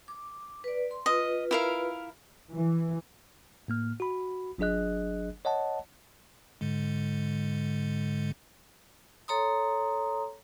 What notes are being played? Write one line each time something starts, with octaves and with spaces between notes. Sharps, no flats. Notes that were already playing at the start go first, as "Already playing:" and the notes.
D6
B4 D5
C6
F4 B4 D#5
E4 A#4 F5
E3
A2 A#3 F6
F#4 B5
G1 F#3 D4 G#4 D#5 F#6
C#5 D#5 F#5 A5
G#2 D3 G#3
A4 C#5 A#5 C6 D#6